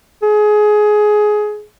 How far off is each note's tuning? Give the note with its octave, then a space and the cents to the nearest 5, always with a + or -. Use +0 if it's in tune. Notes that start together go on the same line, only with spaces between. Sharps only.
G#4 +20